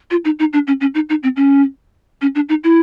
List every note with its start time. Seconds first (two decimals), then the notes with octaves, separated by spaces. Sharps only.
0.11 F4
0.25 D#4
0.39 D#4
0.53 D4
0.67 C#4
0.81 C#4
0.95 D#4
1.09 D#4
1.23 C4
1.36 C#4
2.21 C#4
2.35 D4
2.49 D#4
2.64 E4